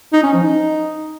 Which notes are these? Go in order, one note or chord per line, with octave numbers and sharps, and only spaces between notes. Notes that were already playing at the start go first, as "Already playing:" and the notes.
D#4
C#4
F3
D#4